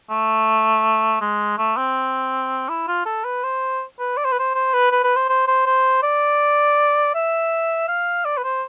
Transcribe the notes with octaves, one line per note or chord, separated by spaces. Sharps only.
A3
G#3
A3
C4
E4
F4
A4
B4
C5
B4
D5
C5
B4
C5
C5
B4
B4
B4
C5
C5
C5
C5
D5
E5
F5
D5
B4
C5